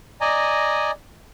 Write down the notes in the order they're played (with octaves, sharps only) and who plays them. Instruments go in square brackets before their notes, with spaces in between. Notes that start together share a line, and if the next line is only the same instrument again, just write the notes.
[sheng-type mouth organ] D5 D#5 G#5 A#5